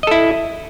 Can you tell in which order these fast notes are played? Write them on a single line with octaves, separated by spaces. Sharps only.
D#5 A4 E4